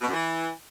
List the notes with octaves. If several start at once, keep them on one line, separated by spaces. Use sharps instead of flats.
B2
F#2
E3